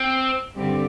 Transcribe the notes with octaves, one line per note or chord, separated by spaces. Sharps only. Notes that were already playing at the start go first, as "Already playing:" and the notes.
Already playing: C4
G2 D3 G3 C4 G4